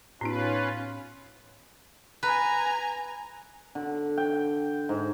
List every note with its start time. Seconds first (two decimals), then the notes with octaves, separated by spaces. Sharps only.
0.21 A2 B3 C#4 D#4 F4 B4
2.23 B4 G#5 A#5
3.75 D3
4.17 G5
4.89 G#2